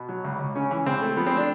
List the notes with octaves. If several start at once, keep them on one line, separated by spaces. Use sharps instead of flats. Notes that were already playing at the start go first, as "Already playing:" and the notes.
Already playing: B2
F#3
C#2
C#2
C#3 C#4
E3
C#2 C4
A3
F3 B3
C4
A3 D4